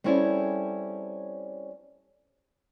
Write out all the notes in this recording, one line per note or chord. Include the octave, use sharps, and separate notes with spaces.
G3 C4 C#4 E4 G#4 A4